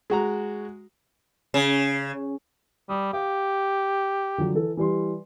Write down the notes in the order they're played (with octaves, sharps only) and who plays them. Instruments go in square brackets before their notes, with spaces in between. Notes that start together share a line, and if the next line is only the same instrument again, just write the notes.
[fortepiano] G#3 F#4 A#5
[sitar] C#3
[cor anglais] G3 [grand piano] D#6
[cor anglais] G4 [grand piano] F5
[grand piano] D3 F3 F#3
E3 A4
E3 G3 C6